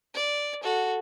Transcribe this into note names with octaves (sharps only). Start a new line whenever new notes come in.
D5
F#4 A4